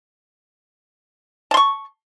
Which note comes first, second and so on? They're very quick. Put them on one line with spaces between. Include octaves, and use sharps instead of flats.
A5 C6 C#6